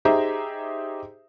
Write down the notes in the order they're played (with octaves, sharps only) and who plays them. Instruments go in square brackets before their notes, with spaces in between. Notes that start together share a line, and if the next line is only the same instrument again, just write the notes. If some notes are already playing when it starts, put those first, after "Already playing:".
[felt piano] D#4 G4 G#4 C5 E5 A#5